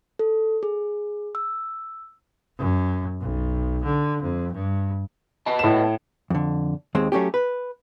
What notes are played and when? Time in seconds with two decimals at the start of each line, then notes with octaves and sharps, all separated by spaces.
0.19 A4
0.63 G#4
1.35 E6
2.58 F#2
3.21 B1
3.84 D3
4.22 F2
4.53 G2
5.46 B3 D#5 A5
5.59 A2 E7
6.30 F2 D3
6.95 D#2 G#3 C4
7.12 F#3 A3 C#4 G4
7.34 B4